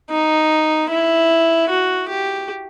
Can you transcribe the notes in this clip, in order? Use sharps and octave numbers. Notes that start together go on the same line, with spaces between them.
D#4
E4
F#4
G4